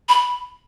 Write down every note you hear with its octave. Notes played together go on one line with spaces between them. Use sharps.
B5